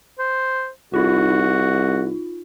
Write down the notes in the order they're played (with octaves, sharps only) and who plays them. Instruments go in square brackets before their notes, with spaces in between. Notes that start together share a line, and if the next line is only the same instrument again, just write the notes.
[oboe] C5
[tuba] C2 [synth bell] D#4 F4 [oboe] F#4